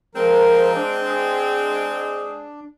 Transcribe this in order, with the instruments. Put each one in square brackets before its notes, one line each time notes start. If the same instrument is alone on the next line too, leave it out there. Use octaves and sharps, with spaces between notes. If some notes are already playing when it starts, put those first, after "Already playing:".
[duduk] F3 [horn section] G#3 C4 [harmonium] A#4
[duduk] D4
[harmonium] D4 [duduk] G#4